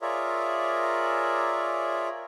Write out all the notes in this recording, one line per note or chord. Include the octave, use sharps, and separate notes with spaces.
F4 G#4 A#4 C#5 D5 E5